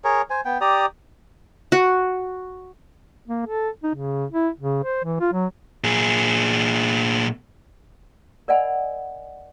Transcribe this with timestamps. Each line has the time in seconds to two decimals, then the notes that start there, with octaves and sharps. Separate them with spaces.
0.04 G#4 A#4 C#5
0.30 C5 G#5
0.45 B3 G5
0.61 G4 D5 A#5 D#6
1.72 F#4
3.28 A#3
3.46 A4
3.83 D#4
3.95 C#3
4.31 E4
4.60 C#3
4.84 C5
5.04 E3
5.20 F4
5.33 F#3
5.84 A#2 G#4
8.48 A#4 D5 D#5 F#5 G#5 B5